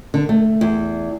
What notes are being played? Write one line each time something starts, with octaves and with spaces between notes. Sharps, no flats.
D3
A3
E2